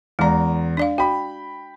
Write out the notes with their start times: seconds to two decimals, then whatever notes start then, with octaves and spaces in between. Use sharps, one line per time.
0.19 E2 G#3 D5 A#5
0.77 D4 D5 F5
0.98 F#4 G5 B5